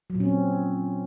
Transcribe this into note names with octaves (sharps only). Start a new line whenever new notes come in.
F#3
A#2
C#4
C4